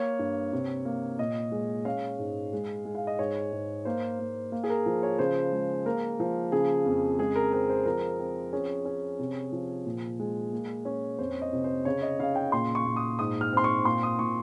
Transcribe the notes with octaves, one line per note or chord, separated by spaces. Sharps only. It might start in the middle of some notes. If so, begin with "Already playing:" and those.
Already playing: A#3 C#5
G2
C3
A#3
A#2 D#5
G#3
C#4 F5
G#2
G#3
G#3
F5
D#5
G#2 C#5
G#2
A#3 C5
A#3
A#3
G#4
A#4
F3
C#5
C#3 C5
G#3
A#3 A#4
F3
C#3 G#4
F2
G#3 G#4
A#4
C4 A#4
C5
F3 A#4
C4
C#4 G#4
C#4
C3
F3
A#2
G#3
A#3
C#4
F2 C5
D#5
C3
C5
C#3 C#5
D#5
C#3 F5
G5
A#2 C6
C#6
A#2
D#6
G#2 D#6
F6
C4 C6
C#6
A#2 C6
D#6
A#2 C#6